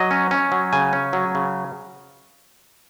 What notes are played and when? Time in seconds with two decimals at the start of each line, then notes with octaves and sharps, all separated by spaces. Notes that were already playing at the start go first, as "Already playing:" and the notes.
Already playing: F#3 D#5
0.11 C#4
0.31 C#4
0.52 F#3
0.73 C#3 G#5
0.93 C#4
1.13 F#3
1.35 C#3